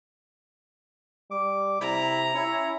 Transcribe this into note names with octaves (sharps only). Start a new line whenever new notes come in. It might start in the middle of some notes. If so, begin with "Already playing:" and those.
G3 D6
C3 E4 A#5
C#4 E4 C#5